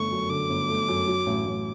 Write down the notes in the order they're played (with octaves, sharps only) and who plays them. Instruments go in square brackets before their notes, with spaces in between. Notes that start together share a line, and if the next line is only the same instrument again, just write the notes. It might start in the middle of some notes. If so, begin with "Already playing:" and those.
Already playing: [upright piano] G1 D3 A3 [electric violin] C#6
[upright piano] F#2
[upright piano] D3 [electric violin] D6
[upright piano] G1
A3
F#2
F#3
A1
A1